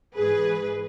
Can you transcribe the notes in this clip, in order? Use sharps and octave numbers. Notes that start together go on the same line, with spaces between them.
G#2 E3 G#4 B4